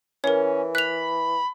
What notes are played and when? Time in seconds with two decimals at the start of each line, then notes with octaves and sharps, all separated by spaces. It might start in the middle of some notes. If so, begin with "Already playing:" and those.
0.24 E3 C#4 A#4 C#5
0.75 B5 F#6 F7